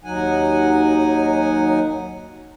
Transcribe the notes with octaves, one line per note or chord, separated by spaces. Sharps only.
D#2 F#3 D#4 F#5 G#5